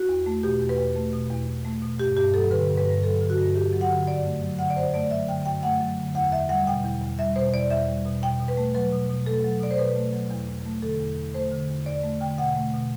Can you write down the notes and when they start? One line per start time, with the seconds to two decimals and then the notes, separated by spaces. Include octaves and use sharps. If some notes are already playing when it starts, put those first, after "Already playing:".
Already playing: F#4
0.09 E2
0.26 A3
0.43 B2 G4
0.61 E2
0.69 B4
0.78 E2
0.96 A3
1.13 B2
1.30 E2
1.48 E2
1.65 A3
1.82 B2
1.99 G2 G4
2.17 G2 G4
2.34 F#3 A4
2.51 D3 B4
2.69 G2
2.77 B4
2.86 G2
3.03 F#3 A4
3.21 D3
3.30 F#4
3.38 G2
3.55 G2 G4
3.73 F#3
3.81 F#5
3.90 D3
4.07 F#2 D5
4.25 A3
4.42 F#3
4.59 D3 F#5
4.70 D5
4.76 F#2 C5
4.93 A3 D5
5.11 F#3 E5
5.28 D3 G5
5.46 F#2 G5
5.63 A3 F#5
5.80 F#3
5.98 D3
6.15 E2 F#5
6.32 E2 E5
6.49 G3 F#5
6.67 B2 G5
6.84 E2
7.02 E2
7.19 G3 E5
7.36 B2 C5
7.53 E2 D5
7.70 E2 E5
7.88 G3
8.06 B2
8.23 B2 G5
8.40 B2
8.48 B4
8.57 A3
8.75 F#3 B4
8.92 B2
9.09 B2
9.26 A3 A4
9.44 F#3
9.61 B2 D5
9.71 C5
9.78 B2 B4
9.96 A3
10.13 F#3
10.30 E2
10.48 E2
10.65 A3
10.82 D3 A4
11.00 E2
11.17 E2
11.34 A3 C5
11.52 D3
11.68 E2
11.86 E2 D5
12.04 A3
12.21 D3 G5
12.38 B2 F#5
12.55 A3
12.74 B2